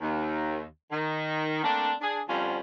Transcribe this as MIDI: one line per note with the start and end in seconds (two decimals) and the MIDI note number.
0.01 0.63 39
0.91 1.62 51
1.64 1.92 57
1.64 1.92 58
1.64 1.92 60
1.64 1.92 62
2.01 2.21 62
2.01 2.21 68
2.28 2.59 41
2.28 2.59 50
2.28 2.59 53
2.28 2.59 55
2.28 2.59 61
2.28 2.59 65